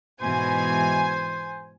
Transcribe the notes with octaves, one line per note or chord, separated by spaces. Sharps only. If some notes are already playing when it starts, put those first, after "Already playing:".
G#2 B2 E3 C5 G#5